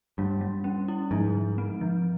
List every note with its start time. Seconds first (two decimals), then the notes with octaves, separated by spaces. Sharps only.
0.18 G2 G3
0.41 G3
0.64 C#4
0.88 E4
1.11 G#2 F3
1.35 F3
1.58 C4
1.81 F3